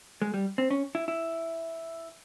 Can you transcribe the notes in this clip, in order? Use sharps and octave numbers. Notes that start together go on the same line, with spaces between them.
G#3
G3
C4
C#4
E4
E4